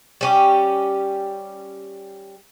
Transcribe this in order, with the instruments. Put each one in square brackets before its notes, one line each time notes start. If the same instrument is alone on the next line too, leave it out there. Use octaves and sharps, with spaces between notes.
[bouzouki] G3 C#4 G4